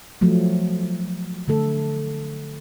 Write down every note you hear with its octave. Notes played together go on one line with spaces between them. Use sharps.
F3 F#3 A3
D3 A3 A4